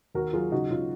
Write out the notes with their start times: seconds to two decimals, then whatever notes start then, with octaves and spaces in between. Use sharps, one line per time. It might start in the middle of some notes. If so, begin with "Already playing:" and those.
0.14 D#2 F#4 A#4
0.33 F#3 F4 G#4
0.52 C#3 D#4 F#4
0.70 C#3 F4